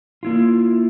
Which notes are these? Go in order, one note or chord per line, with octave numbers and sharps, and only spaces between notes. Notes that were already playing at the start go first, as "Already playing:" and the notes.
A#3 E4 F4